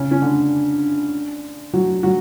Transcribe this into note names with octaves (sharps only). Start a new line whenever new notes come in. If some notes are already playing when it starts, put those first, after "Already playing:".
Already playing: C#3 C#4
C#4
D3 D4
F#3 F#4
F#3 F#4